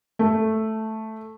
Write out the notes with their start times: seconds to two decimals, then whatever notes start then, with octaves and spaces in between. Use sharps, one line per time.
0.19 A3